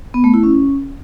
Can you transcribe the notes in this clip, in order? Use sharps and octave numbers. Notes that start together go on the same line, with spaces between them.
B3
A3
E4
C#4